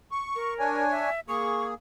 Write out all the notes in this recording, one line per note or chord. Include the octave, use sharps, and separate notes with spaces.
C#6
A#4
D4 C#5 G#5
E5
A#3 G#4 C#6